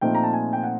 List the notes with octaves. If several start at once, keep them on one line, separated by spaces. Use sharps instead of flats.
A#2 F3 A3 C4 D#4 G5
A#5
A5
G#5
G5
F#5